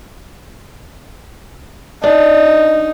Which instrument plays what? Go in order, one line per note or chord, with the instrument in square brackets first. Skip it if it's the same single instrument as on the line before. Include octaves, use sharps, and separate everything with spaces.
[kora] D4 [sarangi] D#4